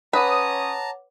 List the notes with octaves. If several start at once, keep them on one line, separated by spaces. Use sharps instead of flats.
C#4 B4 C#5 F#5 A5 A#5 D6 D#6